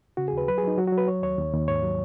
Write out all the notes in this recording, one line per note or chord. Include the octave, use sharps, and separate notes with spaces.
C#3 F#4
G#4
D#2
B4
F#3 B4
G#4
F#3 D#4
F#3 F#4
F#4
F#3
B4
F#3 C#5
D#2 C#5
D#2
D#2
G#2 C#5
F#3